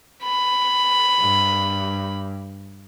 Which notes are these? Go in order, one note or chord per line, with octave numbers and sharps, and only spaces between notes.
B5
G2